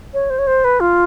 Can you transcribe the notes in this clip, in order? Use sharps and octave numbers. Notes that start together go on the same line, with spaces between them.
C#5
C5
C#5
C5
B4
F4